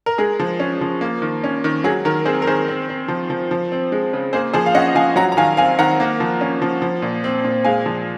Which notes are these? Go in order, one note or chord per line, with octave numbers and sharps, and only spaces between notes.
A#4
G#3 G#4
F3
C#4
F3
A#3
D#3
C#4
D#3
F#3 G#4
D#3 A#4
C4 G#4 C5
A#4
D#3 G#4 C5
C4
C4
F3
F3
F3
C4
G#3
C#3
A#3 G#4 C5
F3 G#4 C5
F5
C#4 D#5 F#5
F3 F5 G#5
F#3 F#5 A#5
A#5
D#3 F5 G#5
C4 F5 G#5
D#3 F#5 A#5
A#3
F3
C#4
F3
F3
A#2
C4
A#2
G#3 F5 G#5
F3